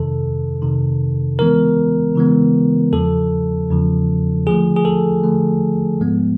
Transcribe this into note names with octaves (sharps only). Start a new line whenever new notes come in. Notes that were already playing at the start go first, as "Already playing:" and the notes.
Already playing: F2 C3 D#3 A4
F2 C3 D#3
C#3 E3 G#3 B3 A#4
C#3 E3 G#3 B3
E2 C#3 F3 A4
E2 C#3 F3
D3 F3 A3 G#4
G#4
A4
D3 F3 A3
G#2 F3 G#3 B3